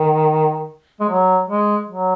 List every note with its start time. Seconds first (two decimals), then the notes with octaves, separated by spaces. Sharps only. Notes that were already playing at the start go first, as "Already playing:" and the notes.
Already playing: D#3
1.01 G#3
1.09 F#3
1.48 G#3
1.89 F#3